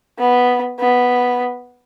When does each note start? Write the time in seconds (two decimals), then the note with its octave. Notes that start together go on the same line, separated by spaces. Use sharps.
0.19 B3
0.79 B3